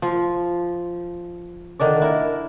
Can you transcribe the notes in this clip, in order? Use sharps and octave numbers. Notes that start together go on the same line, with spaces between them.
F3
D3 D#3 D4 D5
E4 A#4